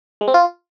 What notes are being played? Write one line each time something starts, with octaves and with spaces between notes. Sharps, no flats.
G#3
C4
F4